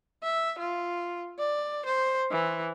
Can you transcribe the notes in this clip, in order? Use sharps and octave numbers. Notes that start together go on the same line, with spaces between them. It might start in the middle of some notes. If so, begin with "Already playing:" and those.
E5
F4
D5
C5
E3